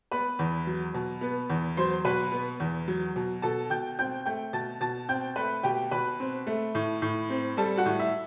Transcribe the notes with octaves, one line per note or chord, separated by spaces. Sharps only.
B3 B4 B5
E2
F#3
B2
B3
E2
F#3 C5 C6
B2 B4 B5
B3
E2
F#3
B2
B2 A4 A5
B2 G5 G6
C4 G5 G6
A3 G5 G6
B2 A5 A6
B2 A5 A6
C4 G5 G6
A3 B4 B5
B2 G4 G5
B2 B4 B5
C4
A3
A2
A2
C4
G3 A4 A5
F#4 F#5
A2
E5